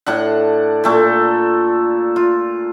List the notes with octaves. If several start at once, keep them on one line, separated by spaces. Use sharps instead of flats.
A2 D4 F#5
A#2 A3 A4
F4